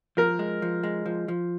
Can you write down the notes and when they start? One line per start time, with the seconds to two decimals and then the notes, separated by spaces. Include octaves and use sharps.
0.17 F3 A#4
0.39 G#3
0.62 F3
0.83 G#3
1.06 F3
1.28 F3